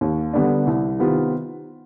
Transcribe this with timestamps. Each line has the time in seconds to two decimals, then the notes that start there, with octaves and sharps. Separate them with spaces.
0.01 D#2
0.33 D3 G3 B3 D4
0.67 C2
0.99 C3 D#3 B3 F4